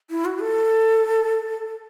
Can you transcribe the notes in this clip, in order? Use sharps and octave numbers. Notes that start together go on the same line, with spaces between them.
E4
F#4
A4